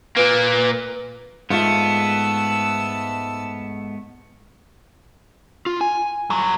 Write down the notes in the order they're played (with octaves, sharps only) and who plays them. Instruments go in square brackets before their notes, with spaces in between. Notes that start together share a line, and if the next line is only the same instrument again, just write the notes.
[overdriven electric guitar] A#2 A#3 [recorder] B4
[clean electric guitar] G#2 A3 [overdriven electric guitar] B3 [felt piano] F4 [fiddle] A5 E6
[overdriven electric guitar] F4
G#5
[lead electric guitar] G2 F#3